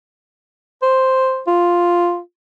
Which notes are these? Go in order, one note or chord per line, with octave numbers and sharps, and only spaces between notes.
C5
F4